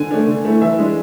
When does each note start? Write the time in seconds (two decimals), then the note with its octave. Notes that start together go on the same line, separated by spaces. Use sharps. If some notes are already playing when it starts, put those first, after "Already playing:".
Already playing: D3 G#5
0.11 A3 D4
0.27 D3
0.45 A3 E4
0.62 E3 E5
0.78 G#3 D4